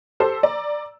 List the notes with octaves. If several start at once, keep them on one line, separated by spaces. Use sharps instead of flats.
G4 A4 C5 A5 C6 E6
D5 A#5